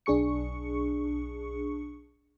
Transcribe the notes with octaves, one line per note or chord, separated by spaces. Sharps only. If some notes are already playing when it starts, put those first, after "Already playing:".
B1 D4 G#4 C#6 C#7